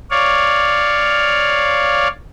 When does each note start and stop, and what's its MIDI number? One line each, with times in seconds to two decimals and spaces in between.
0.10 2.08 73
0.10 2.08 74
0.10 2.08 77